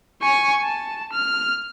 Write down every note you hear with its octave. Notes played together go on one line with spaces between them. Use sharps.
G#5 C#6
A5
F6